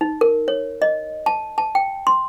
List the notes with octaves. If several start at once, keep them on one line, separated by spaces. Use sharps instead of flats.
D#4
A#4
C#5
D#5
A5
A5
G5
C6